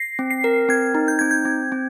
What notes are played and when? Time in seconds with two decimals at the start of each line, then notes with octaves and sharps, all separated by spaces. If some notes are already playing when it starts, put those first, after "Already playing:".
Already playing: A#6 C7
0.19 C4
0.31 C7
0.44 A#4
0.69 C4 G#6
0.95 D#4
1.08 G6
1.19 C4 G#6
1.31 G6
1.45 C4
1.72 C4